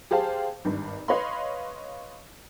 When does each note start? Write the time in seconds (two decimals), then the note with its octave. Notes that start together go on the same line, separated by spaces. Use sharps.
0.11 G4 G#4 C5 F5 A5
0.65 G#1 G2
1.08 B4 C#5 D#5 F5 B5 C6